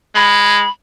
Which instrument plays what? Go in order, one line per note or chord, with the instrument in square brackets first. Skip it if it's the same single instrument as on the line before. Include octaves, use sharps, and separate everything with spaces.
[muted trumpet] G#3 [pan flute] B5